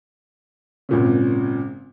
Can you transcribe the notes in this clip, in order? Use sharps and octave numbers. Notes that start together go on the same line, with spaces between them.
G#1 A#2 C#3